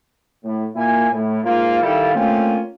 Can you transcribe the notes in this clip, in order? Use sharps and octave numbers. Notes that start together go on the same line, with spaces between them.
A2
A#2 A#3 E4 G#5
A2
G#2 A#3 F4
D#3 G3 E4 A4 F5
A3 A#3 C4 C#4 F4